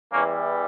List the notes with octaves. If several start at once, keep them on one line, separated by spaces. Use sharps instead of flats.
E2 E3 G3 A#3 C#4